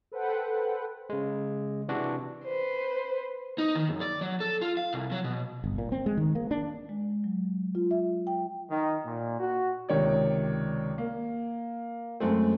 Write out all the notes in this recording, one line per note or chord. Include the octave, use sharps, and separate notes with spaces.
A4 B4 C5 F#5 G5
C#3 G#3
C3 E3 D4 F#4
B4 C5
D#4
D#3
F#2
D5
F#3
A4
F4
F5
C2
F#3
B2
G1
A#2
C4
G#3
D#3
A#3
D4
G#3
F#3
F4
E5
G5
D#3
A#2
F#4
C#2 C3 D#3 C#5 D5
A#3
F#2 G#3 A3 C4